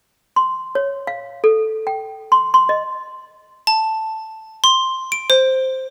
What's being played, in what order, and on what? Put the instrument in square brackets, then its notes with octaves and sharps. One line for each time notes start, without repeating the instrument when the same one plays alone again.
[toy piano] C6
C#5
F5
A4
G5
C6
C6
D#5
[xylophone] A5
C6
D7
C5